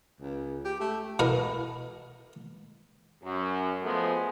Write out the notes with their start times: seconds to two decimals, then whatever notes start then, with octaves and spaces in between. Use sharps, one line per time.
0.21 C#2
0.65 G4
0.81 A3
1.19 B2 E4 A#4 F5 D#6
3.23 F#2
3.83 F3 G#3 A3 B3